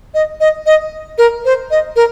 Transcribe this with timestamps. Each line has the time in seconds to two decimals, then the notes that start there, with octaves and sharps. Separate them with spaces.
0.14 D#5
0.40 D#5
0.66 D#5
1.18 A#4
1.45 C5
1.71 D#5
1.96 A#4